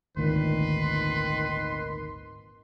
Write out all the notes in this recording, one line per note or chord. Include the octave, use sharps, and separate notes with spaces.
G#1 D2 A#2 D#3 B4 C6